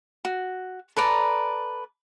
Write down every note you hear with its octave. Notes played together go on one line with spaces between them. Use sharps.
F#4
A4 B4 D5 A#5